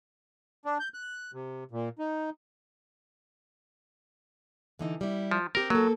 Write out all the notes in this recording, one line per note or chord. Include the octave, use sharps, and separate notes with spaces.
D4
G6
F#6
C3
A#2
D#4
D3 E3 D#4
G3 E4
F3
C4 G4 A#4
F#3 A#3 A4